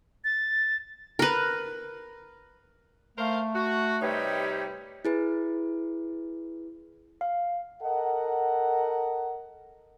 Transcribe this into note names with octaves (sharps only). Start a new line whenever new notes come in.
A6
A#4 B4
A3 A#4 C5 F5
F#4
C3 G3 D#4 G4 B4 C#5
E4 G#4 B4
F5
A4 A#4 D#5 F#5